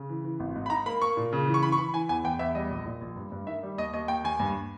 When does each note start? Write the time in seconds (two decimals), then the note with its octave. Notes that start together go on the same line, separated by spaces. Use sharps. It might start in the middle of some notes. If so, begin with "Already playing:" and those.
Already playing: C#3
0.09 E3
0.24 E3
0.40 G#1
0.56 G#2
0.66 B5
0.70 D#4 A#5
0.86 A#3 B5
1.01 A#3 C#6
1.17 A#2
1.32 C#3
1.47 E3
1.54 C#6
1.63 E3 B5
1.72 C#6
1.78 E3 B5
1.93 E3 G#5
2.09 E2 G#5
2.24 E2 G5
2.39 E2 E5
2.55 G3 D#5
2.71 A#1
2.85 A#2
3.01 A#1
3.17 G2
3.32 G2
3.47 D#3 E5
3.63 G3
3.78 D#2 D#5
3.93 D#2 D#5
4.08 D#2 G5
4.24 D#2 G#5
4.40 G2